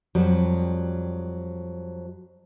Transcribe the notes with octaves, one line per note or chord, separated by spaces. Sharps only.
F2 F#3 G3